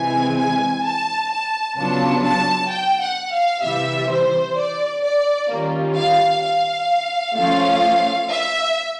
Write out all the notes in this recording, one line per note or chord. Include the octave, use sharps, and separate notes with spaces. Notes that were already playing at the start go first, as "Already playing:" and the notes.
Already playing: C3 E3 G#3 C4 G#5
G#5
A5
A5
C#3 F#3 B3 D4 F4 A5
A5
G5
F#5
F5
C3 E3 G3 E5
C5
D5
D5
D#3 G3 A#3 C#4 F4
F5
F5
F3 A3 C#4 F4 F5
E5